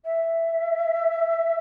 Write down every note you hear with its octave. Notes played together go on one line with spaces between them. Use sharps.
E5